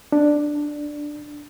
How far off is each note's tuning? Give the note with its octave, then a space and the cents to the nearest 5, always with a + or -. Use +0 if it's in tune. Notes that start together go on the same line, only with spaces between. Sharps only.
D4 +5